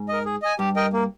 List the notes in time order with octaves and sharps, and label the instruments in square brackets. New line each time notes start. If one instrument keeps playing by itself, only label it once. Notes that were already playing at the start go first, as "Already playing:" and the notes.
Already playing: [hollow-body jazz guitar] G#2
[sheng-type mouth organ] A#4 D#5
G#4
D#5 G#5
[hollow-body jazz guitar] G2 [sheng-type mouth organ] G4
[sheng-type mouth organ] A#4 D#5 G5
A#3